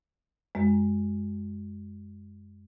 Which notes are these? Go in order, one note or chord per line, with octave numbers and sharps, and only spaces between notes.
F#2 G#3